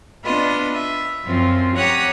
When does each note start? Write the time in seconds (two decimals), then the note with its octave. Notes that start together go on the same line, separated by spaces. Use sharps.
0.24 B3 D4 F4 D#5 B5
0.74 E5
1.24 F#2 F3 C4 F4
1.76 G4 C#5 F#5 A#5 D#6 F#6